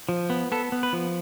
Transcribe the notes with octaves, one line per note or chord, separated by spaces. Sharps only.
F3
B3
B3 A4
B3
B4
F3